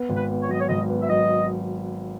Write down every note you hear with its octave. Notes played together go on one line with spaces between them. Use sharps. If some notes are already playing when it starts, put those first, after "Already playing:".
Already playing: B3
G#1
B4
B3
C#5
F#3 D#5
C#5
G#1 D#5
B3
E5
F#3 D#5